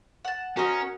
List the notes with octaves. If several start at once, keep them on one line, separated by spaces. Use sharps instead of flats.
F#5 A5
C#4 F#4 A#4 C5 D#5